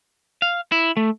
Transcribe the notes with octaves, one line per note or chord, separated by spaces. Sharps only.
F5
E4
A3